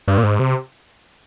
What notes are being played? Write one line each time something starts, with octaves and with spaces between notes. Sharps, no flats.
G2
A#2
G#2
C3